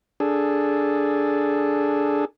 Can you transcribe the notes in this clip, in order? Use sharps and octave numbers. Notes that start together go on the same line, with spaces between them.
D4 G#4 A4